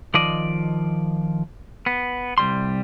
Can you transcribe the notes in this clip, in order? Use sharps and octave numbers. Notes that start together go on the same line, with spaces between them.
D#3 F3 D5 D#5
B3
C2 F2 G3 C6